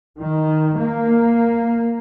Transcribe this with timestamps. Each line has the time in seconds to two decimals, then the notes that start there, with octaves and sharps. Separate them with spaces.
0.19 D#3
0.76 A#3